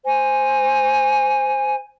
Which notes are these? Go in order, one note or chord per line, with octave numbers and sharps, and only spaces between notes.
C5 G#5